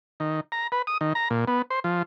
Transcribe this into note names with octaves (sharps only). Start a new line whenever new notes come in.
D#3
A#5
B4
D#6
D#3
A#5
A#2
B3
C5
F3